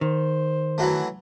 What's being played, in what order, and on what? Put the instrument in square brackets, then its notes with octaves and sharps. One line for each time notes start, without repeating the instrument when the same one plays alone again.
[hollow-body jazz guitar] D#3 [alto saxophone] C5
[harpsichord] E3 F#3 A3